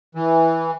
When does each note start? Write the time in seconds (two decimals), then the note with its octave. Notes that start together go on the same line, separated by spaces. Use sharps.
0.15 E3